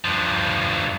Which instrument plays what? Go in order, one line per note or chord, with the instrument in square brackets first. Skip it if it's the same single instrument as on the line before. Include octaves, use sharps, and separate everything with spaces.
[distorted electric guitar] G2 F3